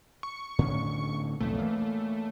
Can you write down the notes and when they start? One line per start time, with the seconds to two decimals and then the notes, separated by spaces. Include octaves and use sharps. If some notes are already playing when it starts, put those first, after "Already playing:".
0.23 C#6
0.59 A2 D3 C#4
1.41 B1 F2 A2 A3
1.59 E3 A#3